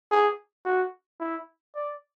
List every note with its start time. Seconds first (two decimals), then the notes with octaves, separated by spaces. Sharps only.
0.12 G#4
0.66 F#4
1.20 E4
1.75 D5